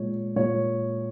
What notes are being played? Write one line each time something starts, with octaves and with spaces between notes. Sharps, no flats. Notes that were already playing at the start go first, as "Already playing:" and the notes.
Already playing: A#2 G#3 C#5
A#2 C#5